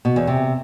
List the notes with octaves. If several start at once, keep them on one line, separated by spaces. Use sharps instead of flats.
B2
E2
C3